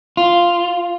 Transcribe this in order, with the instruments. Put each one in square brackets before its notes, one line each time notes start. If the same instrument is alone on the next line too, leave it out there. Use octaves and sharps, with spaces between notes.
[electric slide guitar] F4